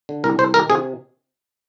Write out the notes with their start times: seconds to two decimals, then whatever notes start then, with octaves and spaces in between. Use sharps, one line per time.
0.09 D3
0.24 C2 A#4
0.39 C2 C5
0.54 D#3 A#4
0.69 C3 G#4